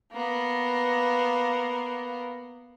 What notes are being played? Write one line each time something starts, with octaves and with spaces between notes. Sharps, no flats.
A#3 B3